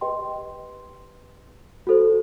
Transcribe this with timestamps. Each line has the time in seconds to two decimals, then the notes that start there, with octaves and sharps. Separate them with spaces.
0.01 G4 B4 D#5 G5 C6
1.87 F#4 A4 C5